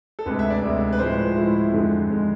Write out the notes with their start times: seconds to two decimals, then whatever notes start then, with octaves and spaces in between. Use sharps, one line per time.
0.19 A4
0.26 D2 C3 G#3 B4
0.39 E5
0.50 D5
0.62 D2 C3 G#3
0.93 B4
0.99 A2 F3 G#3 C5
1.36 A2 F3 G#3 E4
1.72 F2 D3 G#3
2.09 F2 D3 G#3